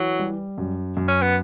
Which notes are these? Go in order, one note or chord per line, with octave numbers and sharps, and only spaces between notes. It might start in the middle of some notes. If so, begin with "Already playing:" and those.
Already playing: E3 F#3
G3
F#2
F#2
C#4
B3